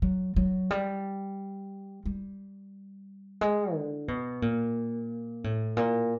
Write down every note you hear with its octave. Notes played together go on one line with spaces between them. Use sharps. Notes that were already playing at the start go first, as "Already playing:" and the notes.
F#3
F#3
G3
G3
G#3
D3
B2
A#2
A2
A#2